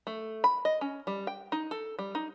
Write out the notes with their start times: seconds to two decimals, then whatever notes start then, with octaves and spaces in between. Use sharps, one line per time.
0.07 A3
0.44 B5
0.65 D#5
0.81 C#4
1.07 G3
1.27 G5
1.52 D#4
1.71 A4
1.99 G3
2.15 D#4